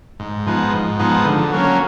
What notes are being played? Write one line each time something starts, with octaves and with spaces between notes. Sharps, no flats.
G#2
F3 G#3 B3 D#4
G#2
F3 G#3 B3 D#4
D3
F#3 A#3 C#4